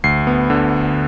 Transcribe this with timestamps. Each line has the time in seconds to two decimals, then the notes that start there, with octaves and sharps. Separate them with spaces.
0.04 D2 C7
0.27 B3
0.50 D3